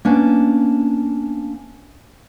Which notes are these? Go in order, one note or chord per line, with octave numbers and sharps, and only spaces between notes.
A#3 B3 C#4 D4